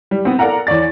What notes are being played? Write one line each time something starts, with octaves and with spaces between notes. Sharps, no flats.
G3
B3 C4
A4 A#4 D5 F5 F#5 A#5
E2 C#5 D5 A6